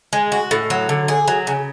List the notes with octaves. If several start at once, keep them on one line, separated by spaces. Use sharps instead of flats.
G#3
F#4
A2
F#3
D3
G#4
F#3
C#3